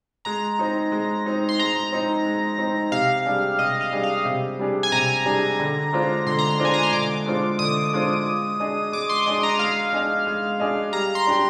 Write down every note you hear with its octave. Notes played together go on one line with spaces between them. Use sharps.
G#3 A#5
C4 D#4
G#3
C4 D#4
C6
G#3 A#5
C4 D#4
G#3
C4 D#4
C3 F5
G3 D4 G#4
C3 D#5
F5
G3 D4 G#4
F5
C3
G3 D4 G#4
G#5
C3 A#5
G3 D4 G#4
D3
G#3 D4 F4 C5
D3 C6
A#5
C6
G#3 D4 F4 C5
G#5
A#5
C6
D3 D6
G#3 D4 F4 C5
D3 D#6
G#3 D4 F4 C5
G#3
D4 G#4 D#5
G#3 D6
C6
D4 G#4 D#5
A#5
G#3 F5
D4 G#4 D#5
G#3
D4 G#4 D#5
G3 A#5
C6
D4 G4